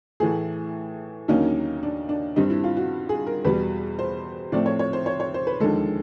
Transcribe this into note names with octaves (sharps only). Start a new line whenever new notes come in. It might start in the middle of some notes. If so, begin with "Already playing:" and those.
A2 E3 A3 G#4
D#2 D3 F#3 A#3 C#4 D#4
D4
D4
G2 D#3 G3 C4 D#4
E4
F4
F#4
G#4
A#4
E2 B2 G3 B4
C5
A2 F3 A3 C4 D5
C#5
C#5
C5
C#5
C#5
C5
B4
D#2 D3 F3 G#3 A4